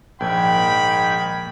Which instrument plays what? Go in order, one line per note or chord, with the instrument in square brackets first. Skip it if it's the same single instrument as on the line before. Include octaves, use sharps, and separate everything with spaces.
[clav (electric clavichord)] A#1 [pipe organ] G#2 D#3 G#6 [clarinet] G5 [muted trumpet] B5